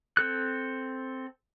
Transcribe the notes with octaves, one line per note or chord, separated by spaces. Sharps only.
C4 A4 F#6